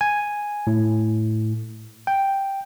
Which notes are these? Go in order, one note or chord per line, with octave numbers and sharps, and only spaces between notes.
G#5
A2
G5